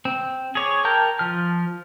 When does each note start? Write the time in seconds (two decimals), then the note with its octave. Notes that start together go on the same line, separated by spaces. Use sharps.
0.05 C4
0.55 G#4 C#5 D6
0.85 A#4 G5 A5 A#5 G6
1.19 F3 F6